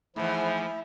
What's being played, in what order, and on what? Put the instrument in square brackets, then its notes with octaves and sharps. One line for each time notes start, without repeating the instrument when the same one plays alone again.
[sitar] G#2 E3 [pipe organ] F3 [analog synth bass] A3 [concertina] E4